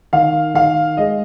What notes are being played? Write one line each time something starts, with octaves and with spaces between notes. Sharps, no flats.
D#3 F5
D#3 F5
G#3 D#5